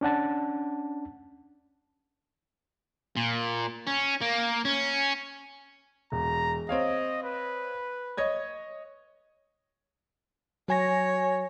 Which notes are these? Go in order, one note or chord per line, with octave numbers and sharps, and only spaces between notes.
C#4 D4 F#5 A5
A#2
C#4
A#3
C#4
E1 A#5
C4 C#5 D#5 F5
B4
C#5 D#5 G#6
F#3 C#5 G#5 A#6